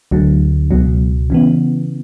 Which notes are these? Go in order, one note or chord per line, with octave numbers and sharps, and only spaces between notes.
D2 D3 F#3
C#2 B2 F#3
C#3 E3 B3